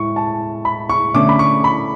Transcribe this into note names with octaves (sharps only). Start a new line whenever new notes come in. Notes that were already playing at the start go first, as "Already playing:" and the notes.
Already playing: A2 G#3 C#6
A5
B5
C#6
D3 A3 C#4 D6
B5
C#6
B5